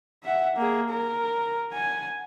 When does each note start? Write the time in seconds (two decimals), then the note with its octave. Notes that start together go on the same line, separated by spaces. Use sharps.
0.24 E5 F#5
0.57 A#3 G#4
0.90 A#4
1.72 F#5 G#5